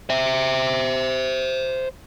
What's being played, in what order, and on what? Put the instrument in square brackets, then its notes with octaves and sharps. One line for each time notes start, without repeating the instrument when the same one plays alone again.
[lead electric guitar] C5 E5